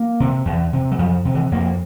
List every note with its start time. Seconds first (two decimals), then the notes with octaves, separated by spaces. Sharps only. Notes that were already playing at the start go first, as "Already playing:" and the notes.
Already playing: A#3
0.20 C3
0.45 E2
0.73 C3
0.91 F#3
0.98 F2 F3
1.25 C3
1.35 E3
1.51 F2 A#3